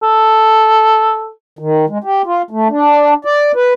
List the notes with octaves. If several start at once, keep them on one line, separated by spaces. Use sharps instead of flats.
A4
D#3
G#3
G4
F4
A3
D4
D5
B4